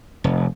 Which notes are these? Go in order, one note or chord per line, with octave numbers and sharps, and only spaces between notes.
F1